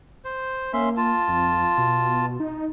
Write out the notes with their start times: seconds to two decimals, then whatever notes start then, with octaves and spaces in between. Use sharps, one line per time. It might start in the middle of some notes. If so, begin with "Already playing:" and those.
0.25 C5
0.73 A#3 C#4 E5 C6
0.97 F4 A5
1.28 F2
1.78 B2
2.40 D#4